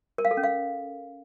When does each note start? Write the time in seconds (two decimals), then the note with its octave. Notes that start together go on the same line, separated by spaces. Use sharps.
0.18 A#4
0.25 F5
0.31 A4
0.37 C#4
0.43 F5